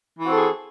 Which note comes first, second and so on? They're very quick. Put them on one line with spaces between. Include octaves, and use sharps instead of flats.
E3 F#4 C4 A4 G#4